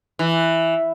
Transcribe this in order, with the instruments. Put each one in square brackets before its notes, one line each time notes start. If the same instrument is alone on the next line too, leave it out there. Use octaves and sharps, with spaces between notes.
[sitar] E3